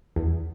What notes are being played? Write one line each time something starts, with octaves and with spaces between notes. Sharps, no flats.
E2